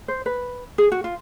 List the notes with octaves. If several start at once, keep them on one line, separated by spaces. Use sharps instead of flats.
C5
B4
G#4
F#4
F4